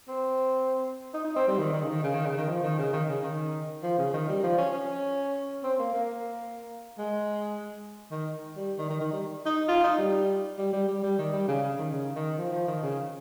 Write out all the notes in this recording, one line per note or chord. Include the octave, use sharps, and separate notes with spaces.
C4
D#4
D#4
C4
G3
D#3
D#3
C#3
D#3
C#3
D#3
C#3
D#3
F3
D#3
C#3
D#3
C#3
D#3
F3
C#3
D#3
G3
F3
C#4
C#4
C4
A#3
A#3
G#3
D#3
G3
D#3
D#3
D#3
G3
D#4
F4
D#4
G3
G3
G3
G3
G3
D#3
G3
C#3
C#3
D#3
C#3
D#3
F3
F3
D#3
C#3